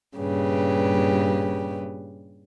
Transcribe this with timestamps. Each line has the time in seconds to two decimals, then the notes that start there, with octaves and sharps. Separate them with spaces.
0.17 G2 A#2 C#3 G4 B4